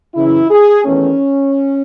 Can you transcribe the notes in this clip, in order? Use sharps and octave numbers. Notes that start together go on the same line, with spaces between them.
F#2 C#3 E3 E4
G#4
E2 D#3 A3 C#4